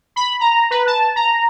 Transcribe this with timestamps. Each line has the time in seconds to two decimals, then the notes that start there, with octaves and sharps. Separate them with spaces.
0.16 B5
0.40 A#5
0.71 B4
0.87 A5
1.16 A#5